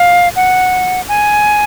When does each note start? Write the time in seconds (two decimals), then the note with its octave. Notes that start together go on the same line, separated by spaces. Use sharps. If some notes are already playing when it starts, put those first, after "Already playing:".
Already playing: F5
0.36 F#5
1.08 G#5